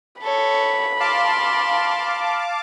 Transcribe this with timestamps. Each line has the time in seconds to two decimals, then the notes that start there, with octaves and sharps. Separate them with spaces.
0.22 A4 C#5 B5
1.00 F5 A5 C6 D6